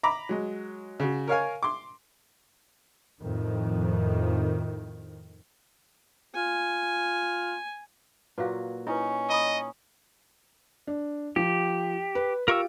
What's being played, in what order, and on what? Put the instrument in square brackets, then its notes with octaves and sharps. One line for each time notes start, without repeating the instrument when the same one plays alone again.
[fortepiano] A#5 B5 D6
F#3 G#3
C#3 F#4
A#4 C#5 F5 G#5
C6 D6
[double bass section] F2 A2 D#3
[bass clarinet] F4 [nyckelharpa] G#5
[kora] A#2 F#3 F#4 [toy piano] B4 F5
[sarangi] C#4 [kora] D#4 [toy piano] E4 B4
[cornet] D#5 [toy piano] A#5 B5 D#6
[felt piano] D4
[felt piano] F3 [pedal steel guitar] G4
[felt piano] B4
[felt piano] F4 G4 D7 [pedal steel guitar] A#4 C#6 E6